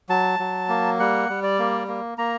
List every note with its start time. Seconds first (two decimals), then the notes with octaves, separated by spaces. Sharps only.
0.09 F#3 A5
0.39 F#3
0.69 A#3
0.99 G3 F#5
1.29 G3
1.43 D5
1.59 A#3
1.88 A#3
2.18 A#3 A#5